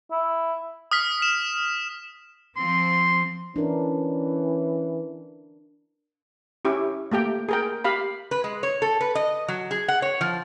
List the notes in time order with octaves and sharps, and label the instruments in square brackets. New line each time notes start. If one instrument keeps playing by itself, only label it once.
[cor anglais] E4
[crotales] D#6 F6 B6
E7
[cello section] F3 C4 [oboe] C6
[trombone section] E3 [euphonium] C#4 [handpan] D4 A#4
[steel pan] C#4 E4 G4
A3 A#3 G4 G5
G#4 A#4 G5
G4 F5 B5
[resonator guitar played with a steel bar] B4
G#3
C#5
A4
B4
D#5
F#3
G#4
F#5
C#5
F3